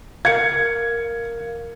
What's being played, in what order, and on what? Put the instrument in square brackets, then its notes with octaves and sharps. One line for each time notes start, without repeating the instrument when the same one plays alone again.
[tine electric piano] A#4 F5 [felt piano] G#6 C#7